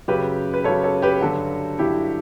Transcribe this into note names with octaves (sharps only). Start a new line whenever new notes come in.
F#2 C#3 F#3 G4 B4
B4
F#2 C#3 F#3 A4 C#5
A4 C#5
G4 B4
G2 D3 F#3 F#4 A4
G2 D3 F#3 E4 G4